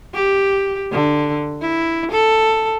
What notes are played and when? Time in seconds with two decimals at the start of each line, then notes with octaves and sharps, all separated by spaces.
0.15 G4
0.92 D3
1.62 E4
2.12 A4